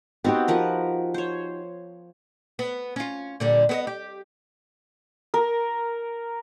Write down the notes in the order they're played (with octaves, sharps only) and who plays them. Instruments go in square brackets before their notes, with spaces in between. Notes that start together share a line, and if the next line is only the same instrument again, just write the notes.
[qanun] B3 C4 [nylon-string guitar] D#4 F#4 G4
[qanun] F3 A#4 B4
C5 C#5
[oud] B3
C#4 F4
A#2 D3 G3
B3 G#4 D#5
G4
[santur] A#4